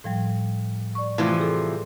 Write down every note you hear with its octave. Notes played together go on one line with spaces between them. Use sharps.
A2 F3 G3
D5 C#6
C3 E3 F3 A3
G#4 A4